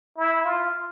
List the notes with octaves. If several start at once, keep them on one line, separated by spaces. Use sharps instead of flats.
E4
F4